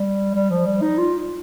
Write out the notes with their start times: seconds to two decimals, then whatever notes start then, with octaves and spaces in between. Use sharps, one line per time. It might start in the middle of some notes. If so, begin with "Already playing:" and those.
Already playing: G3
0.34 G3
0.50 F3
0.66 G3
0.82 D#4
0.98 F4